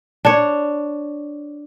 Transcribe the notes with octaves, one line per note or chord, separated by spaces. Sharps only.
D4 C#5